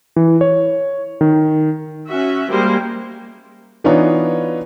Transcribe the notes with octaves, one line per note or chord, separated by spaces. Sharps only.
E3
C#5
D#3
C#4 F#4 E5
G3 G#3 A#3 C5
E3 B3 D4 D#4 F4 C#5